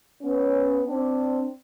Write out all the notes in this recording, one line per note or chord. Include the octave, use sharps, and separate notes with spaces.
B3 C#4
C4 D4